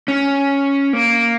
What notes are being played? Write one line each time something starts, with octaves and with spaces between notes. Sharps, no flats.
C#4
A#3